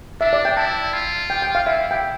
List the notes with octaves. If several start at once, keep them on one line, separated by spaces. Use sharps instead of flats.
D4 E5
D5
G5
E4 A5
F4
G5
G5
F5
E4 E5
G5